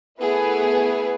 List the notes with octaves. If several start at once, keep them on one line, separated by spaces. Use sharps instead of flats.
A3 B3 E4 G#4 B4